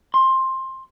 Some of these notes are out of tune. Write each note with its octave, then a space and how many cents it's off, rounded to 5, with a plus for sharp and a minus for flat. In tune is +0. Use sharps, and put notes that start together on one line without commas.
C6 +15